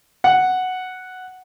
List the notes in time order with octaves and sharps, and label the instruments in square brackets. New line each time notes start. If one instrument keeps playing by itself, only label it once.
[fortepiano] F#5